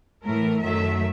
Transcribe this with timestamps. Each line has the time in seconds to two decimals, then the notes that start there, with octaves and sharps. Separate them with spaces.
0.24 A2 E3 A3 A#4
0.61 F#2 D#3 F#3 A3 E5